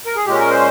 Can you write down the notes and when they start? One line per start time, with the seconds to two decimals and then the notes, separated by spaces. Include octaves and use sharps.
0.06 A#4
0.16 G#4
0.26 A#2 G#3 C#4 G4
0.39 A#4
0.51 C5